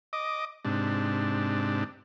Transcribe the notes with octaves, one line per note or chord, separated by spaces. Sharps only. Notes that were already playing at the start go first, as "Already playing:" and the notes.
D#5 D6
G#2 C3 D4